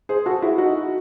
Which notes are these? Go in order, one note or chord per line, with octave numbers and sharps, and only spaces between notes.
G#4 C5
F#4 A4
E4 G#4
D#4 F#4